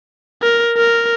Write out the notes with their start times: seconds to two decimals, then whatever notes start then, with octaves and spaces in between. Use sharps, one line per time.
0.43 A#4
0.77 A#4